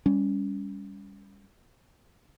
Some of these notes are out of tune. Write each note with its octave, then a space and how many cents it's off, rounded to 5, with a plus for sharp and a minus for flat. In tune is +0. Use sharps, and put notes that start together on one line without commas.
G3 +25 C#4 +20